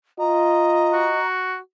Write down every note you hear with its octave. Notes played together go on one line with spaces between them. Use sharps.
F4 D#5 A#5
F#4